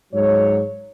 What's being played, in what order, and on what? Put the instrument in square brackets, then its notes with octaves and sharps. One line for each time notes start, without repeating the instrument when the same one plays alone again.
[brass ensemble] G#2 F#3 C#5